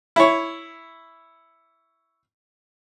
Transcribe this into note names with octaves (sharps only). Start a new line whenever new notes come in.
E4 C#5